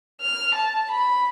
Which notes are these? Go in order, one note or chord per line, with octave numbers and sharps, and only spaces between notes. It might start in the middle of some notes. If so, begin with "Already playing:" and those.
F6
A5
B5